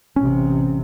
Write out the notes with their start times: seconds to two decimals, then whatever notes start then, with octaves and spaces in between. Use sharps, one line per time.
0.16 A1 C3 C#4